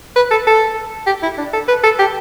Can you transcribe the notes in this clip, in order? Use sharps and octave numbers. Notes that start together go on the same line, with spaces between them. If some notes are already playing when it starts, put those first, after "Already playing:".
B4
A4
A4
G4
E4
D4
A4
B4
A4
G4